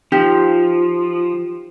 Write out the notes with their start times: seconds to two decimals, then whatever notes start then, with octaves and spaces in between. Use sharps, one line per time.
0.12 F3 D#4 F4 G4